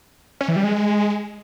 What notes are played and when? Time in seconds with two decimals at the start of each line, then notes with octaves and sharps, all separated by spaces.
0.41 C#4
0.48 E3
0.56 G3
0.64 G#3